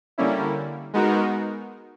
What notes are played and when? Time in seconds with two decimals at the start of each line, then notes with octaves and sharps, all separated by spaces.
0.18 D3 G3 A#3 C#4 E4
0.93 G#3 B3 D#4 F#4 A#4